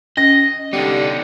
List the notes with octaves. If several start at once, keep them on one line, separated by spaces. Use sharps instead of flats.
C#4 D#5 A#6
D3 G3 B3 D#4